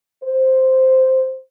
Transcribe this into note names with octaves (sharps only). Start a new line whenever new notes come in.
C5